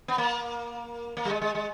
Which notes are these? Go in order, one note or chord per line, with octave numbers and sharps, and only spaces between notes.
B3
A#3
A#3
G3
G#3
G#3
G#3